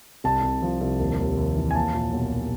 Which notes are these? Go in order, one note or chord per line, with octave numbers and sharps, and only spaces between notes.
C2 A5
C2
F3
C2
D#2
D#2
D#2
E3
G#5
A#3 A5
A#2
B1